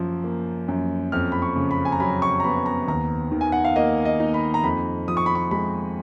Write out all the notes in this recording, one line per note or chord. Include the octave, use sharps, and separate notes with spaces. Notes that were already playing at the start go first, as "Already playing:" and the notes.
Already playing: F#2 F3
A#3
F#2
F2 F6
B5
C#6
C#3
B5
G#5
A#5
F#3 B5
C#6
A#5
B3 B5
A#5
D#2 A#5
D#3
G#5
F#5
F5
A#3 D#5
D#5
D#4
B5
A#5
F2 B5
F3 D#6
C#6
B5
C#6
G#3 B5